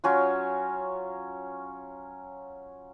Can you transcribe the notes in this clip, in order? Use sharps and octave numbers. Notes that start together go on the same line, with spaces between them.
F#3 C#4 F4